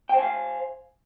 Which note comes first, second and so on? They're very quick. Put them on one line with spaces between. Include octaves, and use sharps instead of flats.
G5 C5 G#5 F5